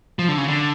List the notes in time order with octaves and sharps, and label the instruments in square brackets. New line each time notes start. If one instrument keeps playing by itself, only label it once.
[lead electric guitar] F3
D3
C#3
D3